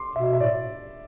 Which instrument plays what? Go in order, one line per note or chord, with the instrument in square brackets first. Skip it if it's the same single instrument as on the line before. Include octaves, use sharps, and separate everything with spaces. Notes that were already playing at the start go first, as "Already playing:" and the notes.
Already playing: [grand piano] C6 D6
[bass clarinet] B2 [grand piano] E5
[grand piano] E5
[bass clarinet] A2 [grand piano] D5